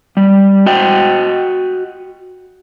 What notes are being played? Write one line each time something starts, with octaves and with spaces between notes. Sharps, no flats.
G3
F#4 D#5 G5